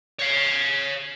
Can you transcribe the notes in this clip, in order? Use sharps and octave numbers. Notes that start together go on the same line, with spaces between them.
C#5 F5